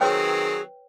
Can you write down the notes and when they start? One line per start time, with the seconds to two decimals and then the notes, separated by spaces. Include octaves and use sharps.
0.01 D#3 F#3 C4 G#4 B4 C#5 G5